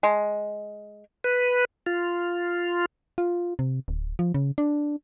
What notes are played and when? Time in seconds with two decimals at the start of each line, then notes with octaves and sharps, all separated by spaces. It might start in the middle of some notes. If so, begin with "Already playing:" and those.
0.03 G#3
1.24 B4
1.86 F4
3.18 F4
3.59 C3
3.88 D1
4.19 F3
4.34 C#3
4.58 D4